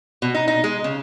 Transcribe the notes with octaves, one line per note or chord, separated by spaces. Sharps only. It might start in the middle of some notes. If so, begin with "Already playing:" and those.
B2
D#4
D#4
G#3
C#3